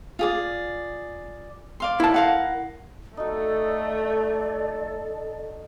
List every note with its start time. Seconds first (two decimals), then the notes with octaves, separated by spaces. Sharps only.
0.19 F4 G#4 D5
1.80 D5 F5 C6
2.00 E4 A5
2.14 A#4 F5 F#5
3.17 A3 D#4 F#4 A4 D5